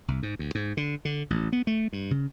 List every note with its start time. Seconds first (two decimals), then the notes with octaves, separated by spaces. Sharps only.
0.08 C2
0.23 G#2
0.39 D2
0.55 G#2
0.77 D3
1.05 D3
1.30 A1
1.52 B3
1.67 A3
1.93 G2
2.11 C#3